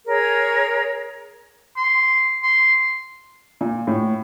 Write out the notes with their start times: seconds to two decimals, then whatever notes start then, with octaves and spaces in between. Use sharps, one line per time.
0.06 G#4 A#4 C#5
1.77 C6
2.43 C6
3.61 A#2
3.87 A2